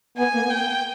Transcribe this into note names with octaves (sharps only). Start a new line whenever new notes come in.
B3 G#5
A#3
B3
G5